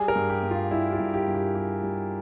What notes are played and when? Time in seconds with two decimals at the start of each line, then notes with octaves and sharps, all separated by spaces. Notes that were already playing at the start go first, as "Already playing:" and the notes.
Already playing: G3 G#4
0.08 A#4
0.16 G2
0.30 G4
0.43 G2
0.51 F4
0.71 G3 E4
0.92 F4
1.00 G2
1.14 G4
1.27 G2
1.34 G4
1.55 G3 G4
1.83 G3